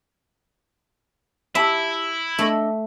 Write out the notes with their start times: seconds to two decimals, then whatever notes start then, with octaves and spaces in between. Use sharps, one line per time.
1.55 E4 G4 E5 A5 B5
2.39 A3 D4 A4 D#5